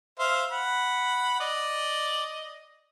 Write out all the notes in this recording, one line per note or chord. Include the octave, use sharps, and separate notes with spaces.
C5 E5 F5
F#5 B5
D5 D#5